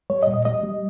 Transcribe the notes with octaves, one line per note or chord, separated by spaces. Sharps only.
G3 C#5
D#5
A#2
D#5
G3 D#5
G3